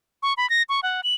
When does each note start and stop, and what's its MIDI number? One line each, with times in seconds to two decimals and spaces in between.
0.23 0.33 85
0.37 0.49 83
0.50 0.62 94
0.69 0.80 85
0.83 1.01 78
1.03 1.15 102